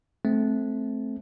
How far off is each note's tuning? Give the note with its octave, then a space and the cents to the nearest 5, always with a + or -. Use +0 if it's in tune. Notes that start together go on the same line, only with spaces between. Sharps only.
A3 -15 C4 +0